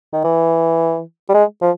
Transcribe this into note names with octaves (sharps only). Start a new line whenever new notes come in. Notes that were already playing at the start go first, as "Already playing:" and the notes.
D#3
E3
G3
G#3
F3